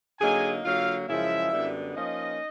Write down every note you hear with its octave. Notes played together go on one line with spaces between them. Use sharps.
D3 F#3 A#3 D#4 G#4 G#5
D3 F#3 A#3 F4 F5
F#2 C#3 F3 G#3 E4 E5
F#2 D3 G3 B3
F3 A#3 C#4 D#4 D#5